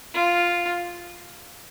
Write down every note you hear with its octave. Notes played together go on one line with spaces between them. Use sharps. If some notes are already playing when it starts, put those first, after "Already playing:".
F4